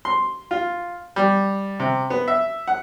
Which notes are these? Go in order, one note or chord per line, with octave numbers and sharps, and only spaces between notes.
C6
F4
G3
C3
B3
E5
F#5